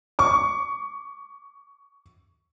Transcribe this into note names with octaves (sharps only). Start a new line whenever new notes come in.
C#6 D6